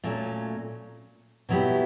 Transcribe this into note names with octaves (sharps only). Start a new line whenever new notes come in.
A#2 F#3 A3 C#4
B2 F#3 B3 E4 G4